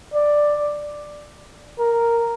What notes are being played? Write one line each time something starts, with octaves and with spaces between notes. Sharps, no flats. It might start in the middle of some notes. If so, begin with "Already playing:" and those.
D5
A#4